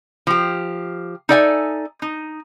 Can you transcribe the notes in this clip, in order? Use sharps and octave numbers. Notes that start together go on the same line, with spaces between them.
F3 G4
D#4 A4 D5 E5 F#5 G#5
D#4